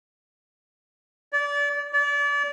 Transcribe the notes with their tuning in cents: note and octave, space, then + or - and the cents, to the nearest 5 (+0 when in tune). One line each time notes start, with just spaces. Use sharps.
D5 -30
D5 -35